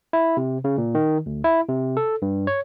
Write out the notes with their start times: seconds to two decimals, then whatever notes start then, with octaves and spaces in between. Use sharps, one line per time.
0.13 E4
0.37 C3
0.64 C#3
0.78 A#2
0.95 D#3
1.26 D2
1.44 E4
1.68 C3
1.97 A4
2.22 G2
2.47 C#5